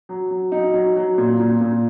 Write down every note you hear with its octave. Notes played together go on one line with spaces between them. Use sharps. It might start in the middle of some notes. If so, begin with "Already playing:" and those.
F#3
F#3
F#3 D#4
F#3
F#3
A#2
A#2
A#2